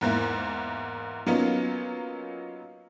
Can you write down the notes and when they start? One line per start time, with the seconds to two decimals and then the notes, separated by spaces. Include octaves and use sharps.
0.01 E2 G#2 A#3 E4
1.26 F#3 A#3 B3 C#4 D#4 F4